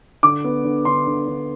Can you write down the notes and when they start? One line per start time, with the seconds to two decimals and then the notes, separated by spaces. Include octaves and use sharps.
0.23 D3 D6
0.44 B3
0.64 D3
0.85 D3 C6
1.07 D3
1.27 D3